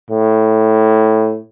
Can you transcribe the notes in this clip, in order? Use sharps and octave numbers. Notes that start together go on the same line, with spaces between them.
A2